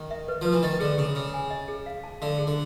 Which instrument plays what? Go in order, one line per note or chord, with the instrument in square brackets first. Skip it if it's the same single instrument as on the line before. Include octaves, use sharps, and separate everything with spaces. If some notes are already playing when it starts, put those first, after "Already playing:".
Already playing: [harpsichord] D#3
[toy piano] E5
B4
[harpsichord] F3 [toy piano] B4
[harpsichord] E3
[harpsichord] D#3 [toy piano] D#5
[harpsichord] D3 [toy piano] G#4
[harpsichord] C#3 [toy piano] G#4
[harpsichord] C#3 [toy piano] G#4
[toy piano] G#5
D#5
G#4
F5
A5
[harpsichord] D3 [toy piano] F5
[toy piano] G#4
[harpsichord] D3